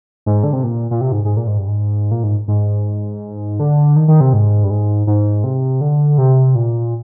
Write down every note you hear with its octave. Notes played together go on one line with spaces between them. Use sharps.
G#2
D3
C3
A#2
A#2
C3
G#2
G#2
A#2
G#2
G2
G#2
A#2
G#2
G#2
D3
D#3
D#3
C3
G#2
G2
G#2
G#2
C3
D3
C3
A#2